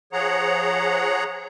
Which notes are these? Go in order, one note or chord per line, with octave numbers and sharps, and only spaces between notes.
F3 G#4 C#5 F#5 A#5